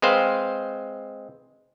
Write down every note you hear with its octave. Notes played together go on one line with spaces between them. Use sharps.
G#3 C4 B4 C5 F5